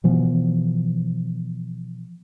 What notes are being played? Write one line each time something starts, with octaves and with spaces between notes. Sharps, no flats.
B2 E3 F3 B3